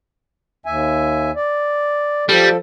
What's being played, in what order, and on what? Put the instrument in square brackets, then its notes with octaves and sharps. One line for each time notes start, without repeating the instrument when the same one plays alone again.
[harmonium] D#2 E5 G#5
D5
[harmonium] F3 A4 [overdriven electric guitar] G3